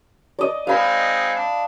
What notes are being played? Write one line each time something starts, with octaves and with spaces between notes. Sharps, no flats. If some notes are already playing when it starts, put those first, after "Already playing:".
D5 D#5
G#3 C4 D#4 F5 B5
D4